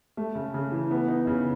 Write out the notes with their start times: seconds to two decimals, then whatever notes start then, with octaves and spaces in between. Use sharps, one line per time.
0.17 A3
0.35 C#3
0.54 C#3
0.72 E3
0.91 B3
1.08 D#4
1.27 C#3